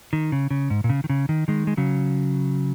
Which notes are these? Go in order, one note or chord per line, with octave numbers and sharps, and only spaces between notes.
D#3
C#3
C#3
G#2
A#2
C#3
D#3
C#3
D#3
D#3 G#3
G#3
C#3 F#3